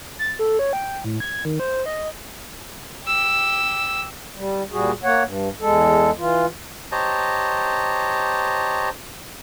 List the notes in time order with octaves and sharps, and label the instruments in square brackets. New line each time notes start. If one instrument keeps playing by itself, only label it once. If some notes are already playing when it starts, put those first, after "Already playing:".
[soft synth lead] A6
A4
C#5
G5
A2
G#6
D#3
C5
D#5
[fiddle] G4 E6
[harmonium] G3
A#2 G3 F#4 G#4
A#3 C#5 F#5
G2
E2 G#3 A4
E3 F4
[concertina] G4 C5 C#5 D#5 A5 A#5